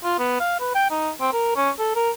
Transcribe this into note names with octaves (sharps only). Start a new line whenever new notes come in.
F4
B3
F5
B4
G5
D#4
C4
A#4
C#4
A4
A#4